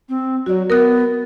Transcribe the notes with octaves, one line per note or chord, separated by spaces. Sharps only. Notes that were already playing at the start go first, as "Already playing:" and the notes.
C4
F#3 F#4 D5
B3 A#4 D#6 F#6